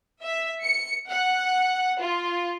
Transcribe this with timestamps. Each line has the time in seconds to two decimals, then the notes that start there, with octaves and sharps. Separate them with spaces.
0.21 E5
0.62 C#7
1.10 F#5
1.99 F4